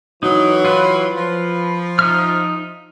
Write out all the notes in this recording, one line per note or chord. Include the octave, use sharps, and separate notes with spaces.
E3 F#3 D#4
F4 B4
F3
D#4 E5 F6